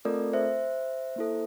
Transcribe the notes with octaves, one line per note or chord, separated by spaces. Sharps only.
A3 C4 F4 A4 A#4 D5
C5 E5
A#3 E4 A4